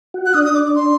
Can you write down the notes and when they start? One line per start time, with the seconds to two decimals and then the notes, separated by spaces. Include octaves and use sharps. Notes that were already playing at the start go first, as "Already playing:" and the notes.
0.14 F#4
0.26 F#6
0.34 D4 D#6
0.45 D#6
0.55 D6
0.65 D6
0.75 C6